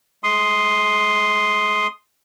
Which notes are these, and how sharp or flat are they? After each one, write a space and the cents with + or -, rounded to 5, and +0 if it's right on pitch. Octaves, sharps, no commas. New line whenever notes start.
G#3 +35 C6 +0 D#6 +0